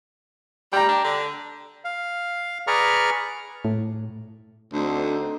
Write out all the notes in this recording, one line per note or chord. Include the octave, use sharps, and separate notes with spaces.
G3 G5 A#5
D4
D3
F5
G#4 B4 D5 A#5 C#6 F6
A2
D2 D3 C4 D4 D#4 C5